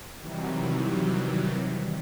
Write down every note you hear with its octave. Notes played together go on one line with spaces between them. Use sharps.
C3 D#3 E3 F#3 G3